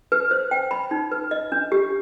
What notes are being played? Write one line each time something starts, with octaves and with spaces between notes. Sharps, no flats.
B4
C5
G5
B5
D#4
B4
D#5
D4
G4